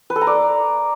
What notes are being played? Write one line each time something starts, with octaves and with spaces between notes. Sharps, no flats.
B4
A4
A#5
D5